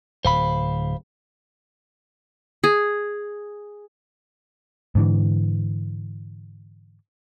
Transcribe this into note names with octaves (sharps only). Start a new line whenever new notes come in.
D1 C5 F5 B5
G#4
G#2 D3 E3